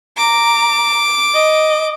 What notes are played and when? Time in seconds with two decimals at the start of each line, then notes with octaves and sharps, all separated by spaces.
0.18 A#5 D6
1.34 D#5